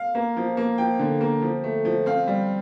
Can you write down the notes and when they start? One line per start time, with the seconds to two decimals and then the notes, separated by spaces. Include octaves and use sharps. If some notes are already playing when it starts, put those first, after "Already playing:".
Already playing: F5
0.15 A#3
0.37 F3
0.57 A#3
0.78 F3 G5
0.99 D3
1.21 A#3
1.42 F3
1.64 A3
1.85 F3
2.06 C4 F5
2.27 G3